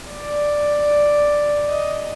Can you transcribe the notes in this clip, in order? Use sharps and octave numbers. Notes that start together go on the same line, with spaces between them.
D5
D#5